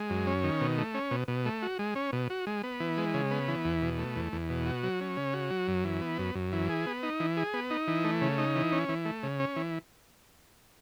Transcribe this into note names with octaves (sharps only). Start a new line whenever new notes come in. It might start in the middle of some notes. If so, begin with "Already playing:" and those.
Already playing: G#3
F#2
C#4
D#3
B2
A3
C#4
B2
B2
A3
F#4
G#3
C#4
B2
F#4
G#3
B3
E3
G#3
C#3
B3
E3
E2
B2
A3
E2
E2
B2
F#4
F#3
C#4
C#3
F#4
F#3
F#2
E3
B3
F#2
F#2
E3
G#4
B3
D#4
E3
G#4
B3
D#4
E3
A3
C#3
D#4
E3
C#4
E3
A3
C#3
C#4
E3